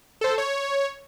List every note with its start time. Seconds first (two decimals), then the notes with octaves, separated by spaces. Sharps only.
0.21 A4 C5
0.38 C#5